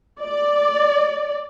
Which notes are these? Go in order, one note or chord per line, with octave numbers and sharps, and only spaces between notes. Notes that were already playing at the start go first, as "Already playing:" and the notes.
D5